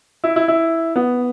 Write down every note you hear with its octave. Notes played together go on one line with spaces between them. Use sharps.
E4
E4
E4
B3